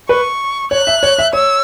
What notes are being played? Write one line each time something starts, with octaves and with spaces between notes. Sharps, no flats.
B4 C#6
C#5 F#6
E5
C#5
E5
C#5 E6